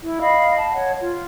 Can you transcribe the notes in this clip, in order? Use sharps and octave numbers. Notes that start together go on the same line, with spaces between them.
E4
D#5 F5 B5
A5
C#5 F#5
F4